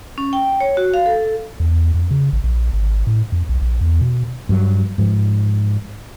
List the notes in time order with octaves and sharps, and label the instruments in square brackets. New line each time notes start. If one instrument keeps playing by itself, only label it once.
[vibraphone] C#4
G5
C#5
F#4
F5
A4
[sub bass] E2
F2
C#3
A1
A#1
G#1
A2
F2
B1
A#1
E2
B2
[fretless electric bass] G2 F#3
G#2 F3